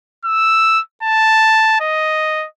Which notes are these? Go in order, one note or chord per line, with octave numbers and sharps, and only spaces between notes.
E6
A5
D#5